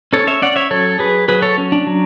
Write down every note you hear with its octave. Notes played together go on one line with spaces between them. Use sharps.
C#4 A4 C#5
C#5 E5
C#4 D5 F#5
C#5 E5
F#3 A4 C#5
F#3 G#4 B4
F#3 G#4 B4
A4 C#5
C#4
D4
F#3